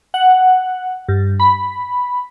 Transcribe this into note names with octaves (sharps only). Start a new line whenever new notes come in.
F#5
G2
B5